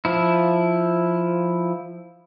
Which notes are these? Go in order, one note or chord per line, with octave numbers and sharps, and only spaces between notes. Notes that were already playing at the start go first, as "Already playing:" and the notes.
F3 E4